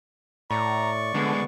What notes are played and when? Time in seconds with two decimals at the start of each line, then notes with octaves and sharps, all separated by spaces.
0.51 A2 D5 A#5 C#6
1.15 D2 D3 G#3 B3